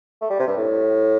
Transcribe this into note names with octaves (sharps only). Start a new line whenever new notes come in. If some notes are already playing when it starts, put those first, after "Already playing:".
A3
G3
C3
G2
A2